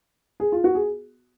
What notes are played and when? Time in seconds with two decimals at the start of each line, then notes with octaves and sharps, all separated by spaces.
0.40 G#4
0.52 F4
0.64 F#4
0.75 G#4